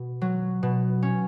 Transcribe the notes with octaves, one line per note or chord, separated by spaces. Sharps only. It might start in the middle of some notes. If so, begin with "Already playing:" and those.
Already playing: B2
F#3
B2
C#4